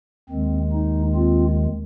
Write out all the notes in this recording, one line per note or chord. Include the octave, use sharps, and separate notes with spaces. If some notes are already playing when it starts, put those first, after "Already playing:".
D#2 D#3 G#3 C4
D#4
C4 F4